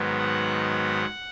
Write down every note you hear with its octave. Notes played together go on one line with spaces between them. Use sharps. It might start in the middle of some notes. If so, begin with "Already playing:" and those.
Already playing: G#2 D#3 F#3 B3
F#5